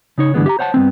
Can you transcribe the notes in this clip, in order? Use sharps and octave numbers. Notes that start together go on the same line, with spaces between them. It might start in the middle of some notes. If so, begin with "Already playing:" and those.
C#3 D#4 C#5
G2 D3 E3 G#3 B3
G4 E5 A#5
C5 C#5 F#5 G#5 A5
G2 G#3 B3 C4